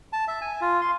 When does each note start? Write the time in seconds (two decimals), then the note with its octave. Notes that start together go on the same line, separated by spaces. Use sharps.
0.13 A5
0.28 E5
0.41 G#5
0.61 F4
0.81 C6